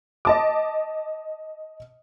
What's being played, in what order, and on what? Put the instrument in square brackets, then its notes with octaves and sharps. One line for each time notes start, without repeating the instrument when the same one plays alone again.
[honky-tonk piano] D#5 A5 D6